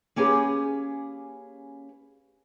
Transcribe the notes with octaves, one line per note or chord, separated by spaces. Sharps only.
A#3 C#4 G4 G#4 B4